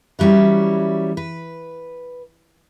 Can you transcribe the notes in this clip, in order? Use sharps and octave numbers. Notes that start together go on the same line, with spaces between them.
E3 F#3 G3 C#4 E4
B4